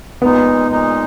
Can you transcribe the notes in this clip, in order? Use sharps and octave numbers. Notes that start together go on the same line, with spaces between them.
A#2 G#3 B3 D#4
A#2 G#3 D#4